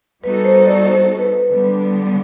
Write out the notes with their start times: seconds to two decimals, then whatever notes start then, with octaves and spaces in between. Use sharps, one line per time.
0.23 G3 B3 D#4 F#4 A4 B4
0.45 C5
0.66 D5
0.87 C5
1.19 B4
1.50 D3 G3 B3 D4